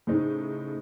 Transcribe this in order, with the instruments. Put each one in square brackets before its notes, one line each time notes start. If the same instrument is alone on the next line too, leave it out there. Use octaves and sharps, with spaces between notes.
[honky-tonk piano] A2 C#3 C4 D#4